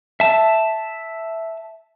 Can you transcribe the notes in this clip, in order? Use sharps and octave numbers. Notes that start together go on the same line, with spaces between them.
E5 A5